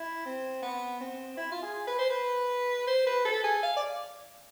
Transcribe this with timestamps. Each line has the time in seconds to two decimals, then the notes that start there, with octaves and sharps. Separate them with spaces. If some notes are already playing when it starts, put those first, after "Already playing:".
Already playing: E4
0.26 C4
0.62 B3
1.01 C4
1.37 E4
1.52 F4
1.62 G#4
1.87 B4
1.99 C5
2.10 B4
2.87 C5
3.07 B4
3.25 A4
3.44 G#4
3.63 F5
3.77 D5